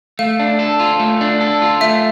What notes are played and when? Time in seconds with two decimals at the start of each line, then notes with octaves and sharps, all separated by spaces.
0.19 A3 F5
0.39 D4
0.59 A4
0.80 F4
1.00 A3
1.21 D4
1.41 A4
1.62 F4
1.81 A3 E5